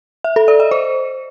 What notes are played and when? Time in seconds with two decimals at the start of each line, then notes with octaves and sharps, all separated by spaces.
0.24 E5
0.36 A4
0.48 D5
0.60 D#5
0.71 C5